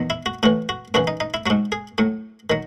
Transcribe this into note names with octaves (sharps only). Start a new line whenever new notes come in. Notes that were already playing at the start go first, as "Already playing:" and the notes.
Already playing: E2 D#3 F#3
E4
F#4
A2 E3 F#4
F#4
F#2 C#3 E3 F#4
D#4
D#4
E4
G#2 F#3 F#4
G#4
A2 F#3
D#3 F#3